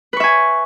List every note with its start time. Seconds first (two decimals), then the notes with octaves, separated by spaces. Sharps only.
0.13 B4
0.17 C#6
0.20 E5
0.24 G#5